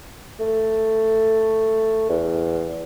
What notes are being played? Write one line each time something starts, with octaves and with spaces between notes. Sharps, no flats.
A3
E2